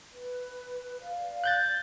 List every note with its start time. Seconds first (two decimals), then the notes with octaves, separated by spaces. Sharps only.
0.14 B4
1.00 D5 F5
1.44 F#6 G6 A6